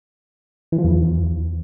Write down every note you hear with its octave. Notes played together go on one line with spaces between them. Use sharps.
E3
F3
E2